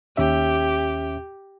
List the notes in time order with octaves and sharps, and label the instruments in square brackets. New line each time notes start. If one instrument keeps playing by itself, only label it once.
[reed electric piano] D#2 C#4 E5 [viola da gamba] G4